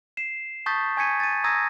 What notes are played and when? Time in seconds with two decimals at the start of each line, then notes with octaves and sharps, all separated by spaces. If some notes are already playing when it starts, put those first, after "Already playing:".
0.17 C7 E7
0.66 A5 C#6 D#6 G6 A6 B6
0.97 G#5 C#6 G#6 B6 C#7 D#7
1.20 A6 D#7
1.44 A#5 D#6 E6 G#6 A#6 D#7